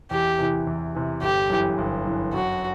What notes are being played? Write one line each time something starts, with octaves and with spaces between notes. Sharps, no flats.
E2 G4
C3 E3
E2
C3 E3
G1 G4
F#2 E3
G1
F#2 E3
F#2 F#4